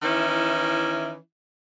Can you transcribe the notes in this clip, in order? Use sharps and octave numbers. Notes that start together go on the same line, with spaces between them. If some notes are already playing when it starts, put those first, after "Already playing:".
D#3 E3 C#4 E4